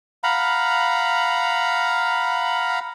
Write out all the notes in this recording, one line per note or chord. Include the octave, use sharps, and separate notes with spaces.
F5 F#5 A#5 B5